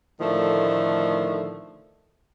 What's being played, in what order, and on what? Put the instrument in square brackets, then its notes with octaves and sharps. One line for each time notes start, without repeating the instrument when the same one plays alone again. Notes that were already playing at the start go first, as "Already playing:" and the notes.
[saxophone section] A2 D3 D#3 F3 A3